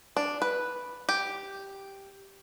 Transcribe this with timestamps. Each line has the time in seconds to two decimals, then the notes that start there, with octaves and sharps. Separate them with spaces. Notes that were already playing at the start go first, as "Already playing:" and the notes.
0.17 D4
0.42 B4
1.09 G4